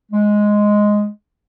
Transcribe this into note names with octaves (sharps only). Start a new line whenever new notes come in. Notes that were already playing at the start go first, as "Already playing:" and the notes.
G#3